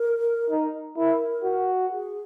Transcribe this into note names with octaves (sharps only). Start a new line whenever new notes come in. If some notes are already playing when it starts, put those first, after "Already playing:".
Already playing: A#4
D#4
E4 A#4
F#4
G#4